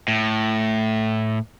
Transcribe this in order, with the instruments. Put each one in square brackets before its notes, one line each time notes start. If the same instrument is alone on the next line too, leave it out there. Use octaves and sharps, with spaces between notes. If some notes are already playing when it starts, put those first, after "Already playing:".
[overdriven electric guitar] A2